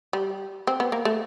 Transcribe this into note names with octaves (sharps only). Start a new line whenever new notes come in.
G3
C4
B3
A#3
A3